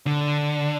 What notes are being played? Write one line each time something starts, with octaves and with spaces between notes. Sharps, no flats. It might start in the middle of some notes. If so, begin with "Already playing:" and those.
D3